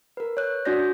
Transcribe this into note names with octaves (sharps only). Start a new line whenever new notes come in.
A#4 B4
C#5 F#6
D4 F#4 D5 G6 A#6